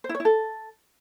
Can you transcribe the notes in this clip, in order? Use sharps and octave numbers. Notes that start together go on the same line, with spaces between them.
C5
E4
C#5
E4
A4